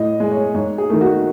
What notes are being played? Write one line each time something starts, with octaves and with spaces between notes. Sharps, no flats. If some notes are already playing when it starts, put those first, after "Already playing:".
Already playing: A2 D#5
G#3
C#5
G#2 C#5
G#4
D#3 A3
F#4